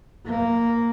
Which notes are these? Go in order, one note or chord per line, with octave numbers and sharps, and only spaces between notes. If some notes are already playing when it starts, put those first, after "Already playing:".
A#3